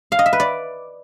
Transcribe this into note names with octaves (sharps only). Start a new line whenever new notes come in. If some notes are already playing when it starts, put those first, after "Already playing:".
F5
D#5
E5
B4
D5